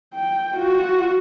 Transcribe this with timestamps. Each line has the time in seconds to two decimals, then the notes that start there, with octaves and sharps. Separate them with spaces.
0.15 G5
0.57 F4 F#4